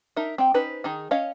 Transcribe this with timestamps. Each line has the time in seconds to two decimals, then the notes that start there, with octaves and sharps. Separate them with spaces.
0.16 D#4 A#4 E5
0.38 C4 G5
0.54 C#4 D#4 B4 C5
0.84 D#3 D#4 G#4
1.11 C#4 C#5 D#5 F5